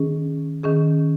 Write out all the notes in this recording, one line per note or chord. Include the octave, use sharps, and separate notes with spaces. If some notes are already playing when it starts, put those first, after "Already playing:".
Already playing: D#3 C#4 G#4
D#3 C#4 G#4